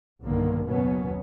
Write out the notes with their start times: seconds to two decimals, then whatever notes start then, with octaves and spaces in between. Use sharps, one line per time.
0.22 B1 G2 D3 D#3 A#3
0.65 F#1 D#2 B2 F#3 B3 C#4